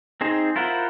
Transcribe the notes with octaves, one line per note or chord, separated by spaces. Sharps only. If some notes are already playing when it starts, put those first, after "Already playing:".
C4 D#4 G#4 C5
E4 F4 A#4 C5 F#5